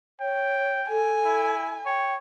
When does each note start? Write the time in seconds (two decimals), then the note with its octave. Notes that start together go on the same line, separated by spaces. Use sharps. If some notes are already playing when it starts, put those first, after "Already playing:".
0.20 C#5 G5
0.89 A4 G#5
1.25 E4
1.86 C#5 G5